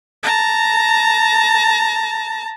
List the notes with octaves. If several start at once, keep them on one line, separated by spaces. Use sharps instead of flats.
A5 A#5